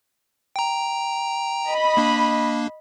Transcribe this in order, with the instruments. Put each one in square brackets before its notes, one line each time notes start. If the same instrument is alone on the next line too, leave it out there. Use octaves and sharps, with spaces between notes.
[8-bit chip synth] G5 A#5
[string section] D#5 B5
[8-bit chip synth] A#3 D4